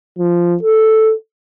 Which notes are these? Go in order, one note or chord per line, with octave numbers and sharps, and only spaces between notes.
F3
A4